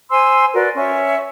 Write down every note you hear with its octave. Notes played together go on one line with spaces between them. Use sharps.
C5 G#5 C6 E6
F#4 A#4 B4 D5
C#4 C#5 E5